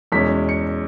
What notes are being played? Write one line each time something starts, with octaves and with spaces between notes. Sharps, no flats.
E2 B2 G#3 C#4 B6
C#7